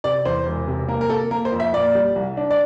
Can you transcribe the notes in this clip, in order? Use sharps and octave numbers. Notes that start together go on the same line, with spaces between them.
C3 D5
E2 C5
E1
C3
A#3 A#4
A#4
A#3 A4
A#3 A#4
C5
F2
E5
A#2 D5
G3
C2
D4
D5